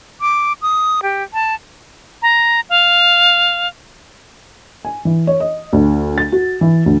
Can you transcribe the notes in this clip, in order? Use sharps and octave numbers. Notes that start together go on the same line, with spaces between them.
D6
D#6
G4
A5
A#5
F5
G#5
E3
C#5
D#5
D2
A6
F#4
E3
D2